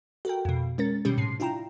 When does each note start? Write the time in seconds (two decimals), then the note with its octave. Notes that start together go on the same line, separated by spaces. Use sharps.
0.25 F#4 A4 A#4 G5
0.45 F2 B2
0.78 G#3 C#4 A#4 A6
1.05 B2 D3 D#3 G3 C#4 G4
1.18 A2 C3 C7
1.40 D4 E4 F4 G5 A#5